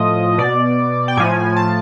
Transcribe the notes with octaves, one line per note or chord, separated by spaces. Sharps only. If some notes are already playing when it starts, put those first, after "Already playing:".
Already playing: A2 F3 D#5
B2 D5
G5
A2 F3 G#5
A5